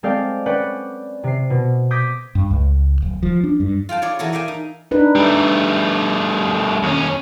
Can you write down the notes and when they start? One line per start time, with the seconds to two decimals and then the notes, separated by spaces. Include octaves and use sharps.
0.03 G#3 C4 A4 D5 F5 G5
0.46 C#4 B4 D5 F#5 G5
1.24 C3 C7
1.50 B2
1.91 D6 D#6 G6 G#6 A#6 B6
2.35 G2
2.51 C#2
3.02 D1
3.23 F3
3.44 D4
3.60 G2
3.89 F4 F5 G5 A5
4.02 F4 G#4 C#5 D5
4.19 E3 F#4 A4 A#4 C#5
4.32 D5 E5 F5 G5 G#5
4.48 D#4
4.91 D4 D#4 B4
5.15 G3 A3
6.83 D#2 C#4